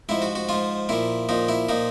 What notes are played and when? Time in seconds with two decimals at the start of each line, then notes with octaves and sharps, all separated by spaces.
0.09 G#2 F3 E4
0.22 F#4
0.35 F#4
0.49 G#2 F3 F4
0.89 A#2 F3 E4
1.29 A#2 F3 D#4
1.49 E4
1.69 A#2 F3 D#4